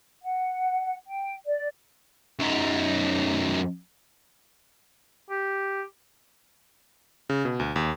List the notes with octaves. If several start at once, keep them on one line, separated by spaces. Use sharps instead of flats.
F#5
G5
D5
F#2 D#4
G4
C#3
B2
D2
D#2